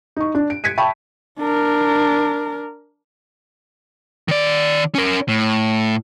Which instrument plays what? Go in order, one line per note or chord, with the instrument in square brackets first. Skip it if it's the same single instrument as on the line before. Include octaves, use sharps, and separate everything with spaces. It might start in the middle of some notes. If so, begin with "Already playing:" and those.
[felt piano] D#4 C#6
D4
D7
G#6 B6 C#7 D#7
E5 G5 A5 B5 C#6
[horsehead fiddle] D4 A#4
[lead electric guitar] D#3 D5
C#4 A#4
A2